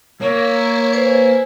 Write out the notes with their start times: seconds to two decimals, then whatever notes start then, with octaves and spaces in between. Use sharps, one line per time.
0.21 A#3 E4 C#5
0.93 B4 C5 G#5